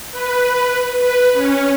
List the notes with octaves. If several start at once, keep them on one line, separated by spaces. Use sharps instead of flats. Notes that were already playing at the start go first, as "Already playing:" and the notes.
B4
B4
C#4